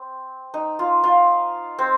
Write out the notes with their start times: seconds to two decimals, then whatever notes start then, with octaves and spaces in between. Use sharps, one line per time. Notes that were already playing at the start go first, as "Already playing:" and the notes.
Already playing: C4
0.54 D#4
0.79 F4
1.04 F4
1.79 C4